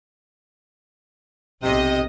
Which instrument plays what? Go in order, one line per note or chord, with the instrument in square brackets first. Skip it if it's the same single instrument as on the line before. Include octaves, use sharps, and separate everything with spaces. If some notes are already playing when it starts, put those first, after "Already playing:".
[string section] B1 D#5 [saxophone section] C3